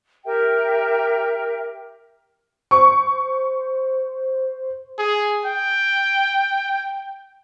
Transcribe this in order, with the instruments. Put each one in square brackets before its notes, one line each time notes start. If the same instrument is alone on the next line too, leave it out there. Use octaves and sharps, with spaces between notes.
[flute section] G4 A#4 E5 G5
[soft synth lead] C5 [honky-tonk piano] C#6
[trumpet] G#4
G5